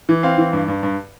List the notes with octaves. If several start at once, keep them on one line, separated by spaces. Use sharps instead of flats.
E3
C4 F5
E3
G2
G2
G2